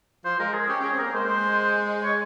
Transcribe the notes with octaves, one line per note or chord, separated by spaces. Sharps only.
F3 C5
G#3 A#4
G#4
C#4 G4
C#4 G#4
C4
A#3 A#4
G#3 C5
C#5